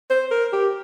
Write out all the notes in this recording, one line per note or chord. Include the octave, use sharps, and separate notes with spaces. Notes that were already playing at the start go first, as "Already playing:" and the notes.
C5
A#4
G4